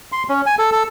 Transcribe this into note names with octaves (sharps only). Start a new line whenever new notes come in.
C6
C#4
G#5
A4
A4